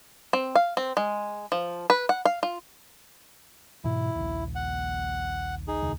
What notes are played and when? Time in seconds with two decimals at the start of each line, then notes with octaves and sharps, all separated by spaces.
0.33 C4
0.55 F5
0.77 C4
0.97 G#3
1.52 F3
1.90 B4
2.09 F#5
2.25 F5
2.43 F4
3.84 G#2 B2 E3 E4
4.15 A#1 D#2
4.55 F#5
5.68 D#4 G#4
5.82 E1 D2